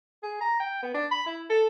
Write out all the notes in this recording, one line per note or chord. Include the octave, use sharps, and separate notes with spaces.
G#4
A#5
G5
B3
D4
B5
E4
A4